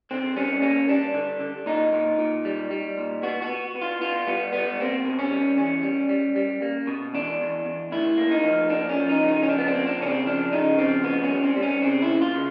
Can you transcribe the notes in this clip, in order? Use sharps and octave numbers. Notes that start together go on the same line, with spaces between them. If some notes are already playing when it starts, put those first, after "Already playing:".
D3 C4
G3 C#4
A#3 C#4
G3 D4
D3
D3
A#2 D#4
A#2
A#2
G3
G3
A#2
B3 F#4
F#4
B3
B3
F4
B3 F4
G3 B3
G3 B3
A#3 C4
B2
C#4
G3
E2 C#4
G3
G3
G3
A#3
B2
E2 D4
E2
E2
D2 E4
A#3
D#4
F3
A#3 D4
C#4
F3
D#4
C#3
D#4
C#4
F3 D4
B3
C4
A#3
D4
C#3 C#4
C4
F3 D4
C#3 D#4
F3 C4
D#2 B3
C#4
G3
C4
G3
C#4
C#3 C4
E4
D#2
F4
C#3